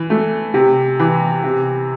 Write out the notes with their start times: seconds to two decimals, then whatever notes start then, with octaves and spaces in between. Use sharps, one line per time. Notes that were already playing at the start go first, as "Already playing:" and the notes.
Already playing: E3
0.10 A3
0.54 C3
0.99 E3
1.44 C3